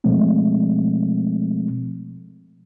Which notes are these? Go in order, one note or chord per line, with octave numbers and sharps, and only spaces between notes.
B2 F3 G#3 A3 C4